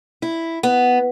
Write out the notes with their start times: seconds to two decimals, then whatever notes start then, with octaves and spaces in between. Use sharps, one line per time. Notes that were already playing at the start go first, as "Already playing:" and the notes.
0.22 E4
0.63 B3